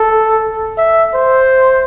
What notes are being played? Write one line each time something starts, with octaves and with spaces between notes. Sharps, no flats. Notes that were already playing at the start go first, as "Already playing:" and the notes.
Already playing: A4
E5
C5